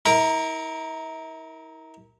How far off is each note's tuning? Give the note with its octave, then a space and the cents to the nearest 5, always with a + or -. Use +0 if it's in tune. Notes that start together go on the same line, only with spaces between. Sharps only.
E4 -40 A#4 +0